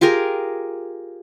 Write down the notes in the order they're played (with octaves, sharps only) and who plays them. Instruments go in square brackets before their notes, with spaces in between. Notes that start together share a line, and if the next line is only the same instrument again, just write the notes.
[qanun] F4 G4 G#4 A#4